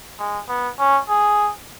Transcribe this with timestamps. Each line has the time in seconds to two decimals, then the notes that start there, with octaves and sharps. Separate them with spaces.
0.19 G#3
0.49 B3
0.79 C#4
1.08 G#4